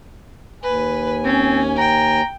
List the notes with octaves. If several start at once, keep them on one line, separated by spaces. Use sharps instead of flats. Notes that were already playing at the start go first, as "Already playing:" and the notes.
D#2 B4 G#5
C4 C#4
G5 A#5